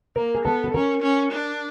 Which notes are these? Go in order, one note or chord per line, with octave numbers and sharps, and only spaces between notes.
A#3 A#4
G#4
B3 A4
A4
C#4 A#4
C#4
D4